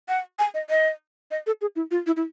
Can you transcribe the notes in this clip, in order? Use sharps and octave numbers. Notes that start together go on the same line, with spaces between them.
F#5
G#5
D#5
D#5
D#5
A4
G#4
E4
F4
E4
E4